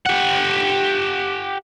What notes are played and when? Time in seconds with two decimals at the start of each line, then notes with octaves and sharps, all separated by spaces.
0.06 G4 F#5